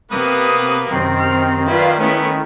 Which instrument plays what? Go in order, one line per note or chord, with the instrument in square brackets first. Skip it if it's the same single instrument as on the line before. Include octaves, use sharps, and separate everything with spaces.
[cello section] C3 [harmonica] A#3 B3 B4 [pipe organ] D#6
[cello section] F#2 C3 C4 [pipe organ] D#3
[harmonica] F6
[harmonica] E4 [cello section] F4 B4 D5
[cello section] A3 C#4 E4 [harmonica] B3